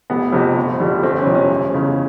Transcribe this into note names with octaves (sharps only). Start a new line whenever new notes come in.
F1 B3
F2 C3
G1
F2 D3 G3
G1 C4
C4
C#4
F2 C3
C#4
F1
E2 C#3